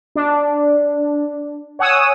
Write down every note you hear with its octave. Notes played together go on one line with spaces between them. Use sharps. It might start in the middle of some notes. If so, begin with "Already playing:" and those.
D4
C#5 F#5 G#5 D#6 E6